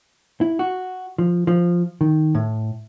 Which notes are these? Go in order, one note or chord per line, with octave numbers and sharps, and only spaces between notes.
E4
F#4
F3
F3
D#3
A2